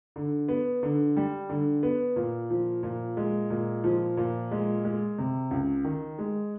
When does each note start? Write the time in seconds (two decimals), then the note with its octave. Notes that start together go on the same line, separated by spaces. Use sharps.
0.16 D3
0.49 B3
0.83 D3
1.17 G3
1.49 D3
1.83 B3
2.16 A#2
2.50 F3
2.83 A#2
3.17 G#3
3.50 A#2
3.84 F3
4.17 A#2
4.51 G#3
4.85 G#3
5.19 C3
5.51 C#2
5.84 D#3
6.19 G#3